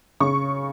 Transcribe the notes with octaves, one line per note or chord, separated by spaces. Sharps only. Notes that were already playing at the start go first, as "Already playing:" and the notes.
C#3 C#6